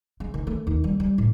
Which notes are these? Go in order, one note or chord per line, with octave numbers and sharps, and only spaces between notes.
G#3
D#3
A3
D#2
G3
G3
A2